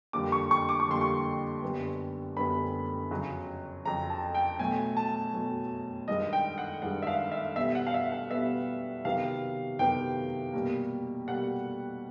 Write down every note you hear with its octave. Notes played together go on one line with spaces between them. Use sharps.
F2 D3 G3 A#3 D6
C#6
C#6
D6
C#6
F2 D3 G3 A#3 C6
C#6
F#2 D3 G3 B3
F#2 D3 G3 B3 B5
F2 C#3 F#3
F2 C#3 F#3 A#5
A5
G5
B2 F#3 A3 G#5
A5
B2 F#3 A3
G2 D#3 G#3 D#5
G5
F#5
G2 D#3 G#3 F#5
E5
F5
E5
B2 G3 B3 E5
F#5
F5
E5
F5
B2 G3 B3 E5
C3 D#3 F#3 B3 F5
C3 D#3 F#3 B3 G5
B2 G3 A#3
B2 G3 A#3 F#5